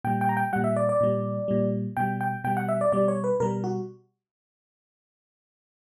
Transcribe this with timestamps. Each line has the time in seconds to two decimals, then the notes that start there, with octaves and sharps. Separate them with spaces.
0.04 A#2 G3 G5
0.21 G5
0.29 A#5
0.37 G5
0.53 A#2 G3 F#5
0.64 E5
0.76 D5
0.89 D5
1.00 A#2 G3
1.48 A#2 G3
1.97 B2 G3 G5
2.21 G5
2.44 B2 G3 G5
2.57 F#5
2.69 E5
2.81 D5
2.92 B2 G3 D5
3.08 C#5
3.24 B4
3.40 B2 G3 A#4
3.64 F#4